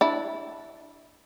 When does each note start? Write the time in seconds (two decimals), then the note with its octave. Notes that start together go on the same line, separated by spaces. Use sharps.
0.01 D4 E4